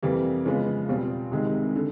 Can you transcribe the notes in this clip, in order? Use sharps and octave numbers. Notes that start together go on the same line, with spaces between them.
F2 C3 E3 G3 A#3
C#3 F3 G#3 B3
E2 B2 G3 C4 F4
C2 C3 D#3 G#3
D3